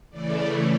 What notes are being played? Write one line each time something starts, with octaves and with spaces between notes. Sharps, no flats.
C#3 E3 A3 D5